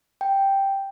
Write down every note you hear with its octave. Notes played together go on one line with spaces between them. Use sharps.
G5